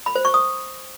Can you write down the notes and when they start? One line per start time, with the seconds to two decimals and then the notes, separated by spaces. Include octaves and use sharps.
0.06 B5
0.15 C5
0.25 C#6
0.34 D#6